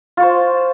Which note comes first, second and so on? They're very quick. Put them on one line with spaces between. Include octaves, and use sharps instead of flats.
F4 C#5 C5